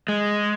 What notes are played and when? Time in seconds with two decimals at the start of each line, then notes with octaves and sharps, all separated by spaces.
0.08 G#3